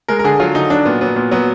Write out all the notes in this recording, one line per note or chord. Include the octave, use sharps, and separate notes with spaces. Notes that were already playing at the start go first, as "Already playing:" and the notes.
G#3 A#4
A#4
D3 G#4
F#3 F4
D3 D#4
F#3 D4
A#2 B3
F#3 B3
A#2 B3
F#3 B3